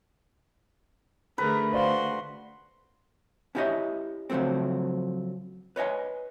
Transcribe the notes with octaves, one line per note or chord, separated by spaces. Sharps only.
D3 A3 G#4 A#4 B4
F#4 C5 D5 F5 C6
C#4 E4 G4 C#5 D#5 E5
C#3 F3 F#3 A3 C4
B4 C#5 D#5 G#5